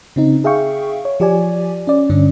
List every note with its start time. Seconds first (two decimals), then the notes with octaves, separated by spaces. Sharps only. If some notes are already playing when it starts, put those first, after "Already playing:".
0.16 C#3 C4 D#4
0.44 G#4 E5 F5 G5 C#6
1.05 C#5
1.20 F3 G4 D5 G#5
1.87 C#4 D5
2.10 G2 D3 C#4 D4